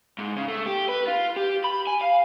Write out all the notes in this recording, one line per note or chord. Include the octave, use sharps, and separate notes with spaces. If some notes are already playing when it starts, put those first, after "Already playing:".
G#2
C#3
A3
G4
B4
F4
G4
B5
G#5
F5